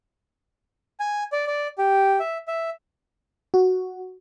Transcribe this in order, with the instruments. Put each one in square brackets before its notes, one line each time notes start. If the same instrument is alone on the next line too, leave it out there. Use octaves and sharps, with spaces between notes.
[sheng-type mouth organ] G#5
D5
D5
G4
E5
E5
[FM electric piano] F#4